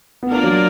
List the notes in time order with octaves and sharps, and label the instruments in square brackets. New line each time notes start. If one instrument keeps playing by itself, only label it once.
[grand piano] B3
[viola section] A#3 F4 A#4 D5 [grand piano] D4
[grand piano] F#3